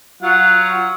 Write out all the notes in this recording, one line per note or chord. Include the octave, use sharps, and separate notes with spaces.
F#3 F4 F#5